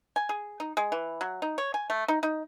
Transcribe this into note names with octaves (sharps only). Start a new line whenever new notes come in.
G#5
G#4
D#4
G#3
E3
F#3
D#4
C#5
G#5
A3
D#4
D#4